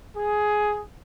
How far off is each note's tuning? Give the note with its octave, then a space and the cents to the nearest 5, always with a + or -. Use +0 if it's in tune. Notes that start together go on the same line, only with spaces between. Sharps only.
G#4 +10